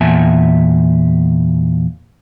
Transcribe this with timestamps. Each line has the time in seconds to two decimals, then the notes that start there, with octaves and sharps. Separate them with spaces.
0.01 E2 A#2 B3 E5 G#5 A5